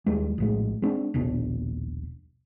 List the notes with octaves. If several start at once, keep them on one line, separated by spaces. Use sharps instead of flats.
D#2 G3 G#3
A#1 A2 G#3
G#3 C4 D4
D#1 A#1 B2 D4